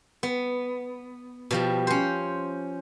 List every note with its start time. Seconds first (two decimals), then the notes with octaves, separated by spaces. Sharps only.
0.23 B3
1.51 B2 F3 G3
1.87 C#4 C5